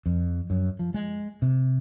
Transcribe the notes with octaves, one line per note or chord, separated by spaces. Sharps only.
F2
F#2
F3
G#3
C3